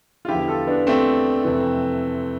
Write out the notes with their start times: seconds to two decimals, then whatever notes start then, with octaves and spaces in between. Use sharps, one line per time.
0.25 F4
0.28 E2 D3 F3 E4 G4
0.48 F4 A4
0.67 B3 D4
0.87 A3 C4
1.45 F2 C3 E3